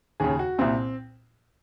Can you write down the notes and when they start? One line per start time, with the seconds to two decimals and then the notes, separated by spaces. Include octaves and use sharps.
0.20 D#2 C#3 G#4
0.39 F#4
0.59 C2 A#2 C4